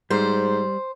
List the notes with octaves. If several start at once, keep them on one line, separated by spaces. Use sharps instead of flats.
G#2 G3 C5